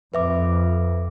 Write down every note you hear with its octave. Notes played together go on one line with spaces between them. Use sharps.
F2 B4 E5 D6